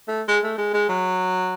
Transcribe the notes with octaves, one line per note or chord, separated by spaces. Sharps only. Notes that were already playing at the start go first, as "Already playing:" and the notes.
A3
G#3
A3
G#3
G#3
F#3